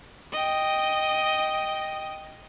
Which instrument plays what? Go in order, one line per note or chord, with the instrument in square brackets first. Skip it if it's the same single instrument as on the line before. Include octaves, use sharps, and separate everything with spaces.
[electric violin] D#5 G5